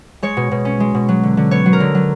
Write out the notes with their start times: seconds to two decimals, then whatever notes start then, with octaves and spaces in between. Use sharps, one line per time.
0.22 G#3 C#5
0.37 B2
0.51 B2
0.65 C#4
0.80 G#3
0.94 B2
1.09 F#3
1.23 D3
1.37 D3
1.51 B3 C#5
1.66 F#3
1.73 A#4
1.80 D3
1.95 F#3